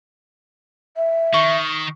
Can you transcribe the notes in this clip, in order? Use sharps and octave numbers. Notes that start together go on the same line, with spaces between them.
E5
D#3 C#6